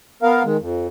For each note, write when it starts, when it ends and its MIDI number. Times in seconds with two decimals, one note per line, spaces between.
0.23 0.43 59
0.23 0.43 70
0.23 0.43 77
0.44 0.57 51
0.44 0.57 56
0.60 0.87 41